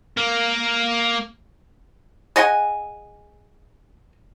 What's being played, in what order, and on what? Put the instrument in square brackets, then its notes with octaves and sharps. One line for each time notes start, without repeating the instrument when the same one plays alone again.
[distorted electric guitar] A#3
[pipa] G#4 D#5 F#5 G#5